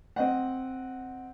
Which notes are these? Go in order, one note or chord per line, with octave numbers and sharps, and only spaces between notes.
C4 D#5 F#5